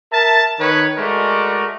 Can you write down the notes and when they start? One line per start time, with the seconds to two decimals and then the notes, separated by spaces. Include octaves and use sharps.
0.12 A#4 E5 A5
0.60 D#3 B4 C#5
0.98 G#3 A3 F#4 A#4 D5